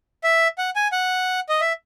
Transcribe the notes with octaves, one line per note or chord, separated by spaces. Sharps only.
E5
F#5
G#5
F#5
D#5
E5